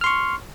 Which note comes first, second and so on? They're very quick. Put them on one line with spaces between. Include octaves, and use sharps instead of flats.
F6 C6 C#6